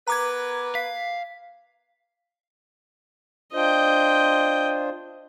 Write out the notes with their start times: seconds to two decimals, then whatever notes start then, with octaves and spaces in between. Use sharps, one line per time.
0.08 B3 A#4 B4 A#5 D6 G#6
0.75 F5 B6
3.53 D4 F4 C5 D#5 G5